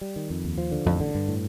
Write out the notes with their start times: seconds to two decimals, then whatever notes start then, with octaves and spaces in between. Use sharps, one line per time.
0.01 G3
0.16 D#3
0.30 F2
0.45 D#2
0.58 F3
0.72 D3
0.85 A1 F2
1.00 D3
1.15 G2
1.28 A2